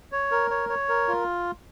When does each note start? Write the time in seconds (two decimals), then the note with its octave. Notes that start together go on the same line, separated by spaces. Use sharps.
0.12 C#5
0.31 A#4
0.51 C#5
0.69 C#5
0.89 A#4
1.08 F4